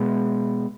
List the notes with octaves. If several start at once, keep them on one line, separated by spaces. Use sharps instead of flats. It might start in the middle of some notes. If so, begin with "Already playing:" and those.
Already playing: B2 G#3 B3